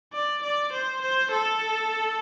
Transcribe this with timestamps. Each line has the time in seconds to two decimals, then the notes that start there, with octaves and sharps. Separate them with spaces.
0.13 D5
0.43 D5
0.73 C5
1.02 C5
1.31 A4